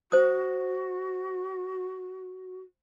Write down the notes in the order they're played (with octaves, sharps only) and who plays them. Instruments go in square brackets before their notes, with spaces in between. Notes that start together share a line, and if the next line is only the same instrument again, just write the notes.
[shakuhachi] F#4 [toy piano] C5 D#6